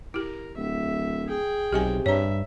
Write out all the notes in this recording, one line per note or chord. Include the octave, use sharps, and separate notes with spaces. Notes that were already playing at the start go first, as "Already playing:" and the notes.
E4 G4 A#4
D1 E5
G#4 G5
B1 C3 G4 D#5 G#5
G2 C#5 E5 A#5